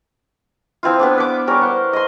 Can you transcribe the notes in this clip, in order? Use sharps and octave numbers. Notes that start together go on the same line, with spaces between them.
F3 C4 E4 F4
B3 D4 D5
B4 D6
G3 C#4 A#4 D5
C5 F#5
D#5 C6